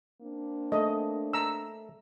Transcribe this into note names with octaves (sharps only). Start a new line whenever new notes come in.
A#3 C4 D4
A3 D#5
A#5 E6